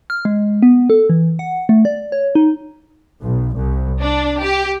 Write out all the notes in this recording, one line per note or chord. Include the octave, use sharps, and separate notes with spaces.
F6
G#3
B3
A4
E3
F#5
A3
D5
C#5
D#4
B1
C2
D4
G4